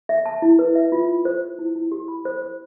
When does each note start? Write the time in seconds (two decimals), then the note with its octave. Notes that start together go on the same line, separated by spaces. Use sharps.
0.09 E5
0.26 A5
0.42 E4
0.59 B4
0.75 E5
0.92 F4
1.09 F4
1.25 C5
1.42 C5
1.59 E4
1.76 E4
1.92 G4
2.08 B5
2.25 C5
2.42 C5